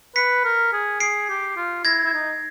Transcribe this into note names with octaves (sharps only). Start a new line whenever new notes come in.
B4 B6 C#7
A#4
G#4
G#4 C7 D7
G4
F4
E4 G#6 A#6
E4
D#4